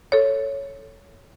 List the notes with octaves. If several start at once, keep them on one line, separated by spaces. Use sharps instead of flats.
A4 C#5